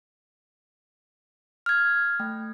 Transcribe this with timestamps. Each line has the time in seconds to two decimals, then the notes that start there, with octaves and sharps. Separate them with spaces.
1.66 F6 G#6
2.19 A3 G5